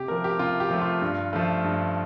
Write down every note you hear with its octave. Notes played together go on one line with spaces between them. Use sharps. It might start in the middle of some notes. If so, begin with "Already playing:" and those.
Already playing: C3 G4
F3 A3 A#4
G4
C3 F4
G4
F3 A3
F4
G2
F3 A3
G2